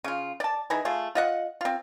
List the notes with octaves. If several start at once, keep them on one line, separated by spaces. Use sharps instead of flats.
C#3 F4
D5 A5
E3 D#4 E4 G#4
A3 F4 G#4
F4 D#5 F#5
C4 F4